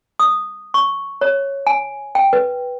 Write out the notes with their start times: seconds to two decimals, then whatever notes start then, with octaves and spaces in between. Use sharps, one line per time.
0.20 D#6
0.74 C#6
1.21 C#5
1.67 G#5
2.15 G5
2.33 B4